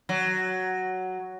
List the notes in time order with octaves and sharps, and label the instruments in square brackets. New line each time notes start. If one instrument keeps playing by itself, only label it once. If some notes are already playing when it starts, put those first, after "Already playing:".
[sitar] F#3